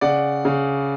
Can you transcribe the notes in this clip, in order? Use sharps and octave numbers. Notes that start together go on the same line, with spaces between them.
C#3 D5 F#5
C#3